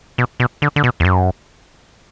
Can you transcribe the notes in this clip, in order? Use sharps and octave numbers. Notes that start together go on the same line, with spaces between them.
B2
B2
D3
D3
B2
E2
F#2